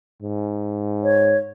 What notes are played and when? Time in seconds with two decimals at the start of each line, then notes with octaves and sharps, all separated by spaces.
0.22 G#2
1.04 C#5